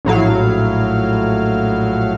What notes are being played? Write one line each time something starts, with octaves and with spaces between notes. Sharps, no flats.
A#1 A2 F#3 F5